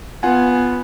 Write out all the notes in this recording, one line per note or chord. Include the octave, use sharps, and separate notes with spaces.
B3 F4 F#5 G#5